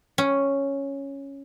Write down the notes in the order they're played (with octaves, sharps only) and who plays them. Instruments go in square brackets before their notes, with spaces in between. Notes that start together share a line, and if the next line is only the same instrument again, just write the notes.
[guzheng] C#4